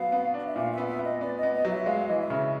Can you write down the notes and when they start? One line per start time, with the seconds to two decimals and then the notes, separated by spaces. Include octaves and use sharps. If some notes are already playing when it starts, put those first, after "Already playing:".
Already playing: F#3 B3 F5
0.12 B3
0.34 D4
0.47 E5
0.56 A#2 F5
0.72 E5
0.78 B3
0.88 E5
0.99 B3
1.05 D#5
1.21 B3 D5
1.38 D#5
1.43 B3
1.54 D#5
1.65 F#3
1.70 E5
1.86 G#3 F5
2.08 E3 D#5
2.20 E5
2.30 C#3